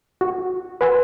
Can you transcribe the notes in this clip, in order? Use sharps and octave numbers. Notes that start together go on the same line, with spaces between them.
F#4
B4 F#5 G#5 B5 C6 E6